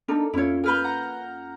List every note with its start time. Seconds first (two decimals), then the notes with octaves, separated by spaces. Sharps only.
0.08 A#3 D4 D#4 A4 A#4
0.33 F2 C#4 E4 F4 C#5
0.64 A#4 B4 G#5 B5 F6 G6
0.84 F#5 A#5